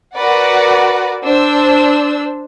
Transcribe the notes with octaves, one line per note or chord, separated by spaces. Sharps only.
F#4 A#4 B4 D5 F#5
D4 C5 E6